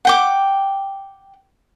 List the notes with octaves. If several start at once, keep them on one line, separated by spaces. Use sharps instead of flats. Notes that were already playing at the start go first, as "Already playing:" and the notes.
F#5 G5 D6